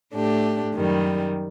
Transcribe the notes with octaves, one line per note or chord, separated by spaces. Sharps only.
A2 A3 D4 G4
F#2 D#3 G3